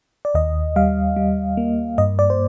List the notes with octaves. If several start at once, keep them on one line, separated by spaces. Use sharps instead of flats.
D5
D#2 D#5
G3 F5
G3
A#3
G2 D#5
D5
C5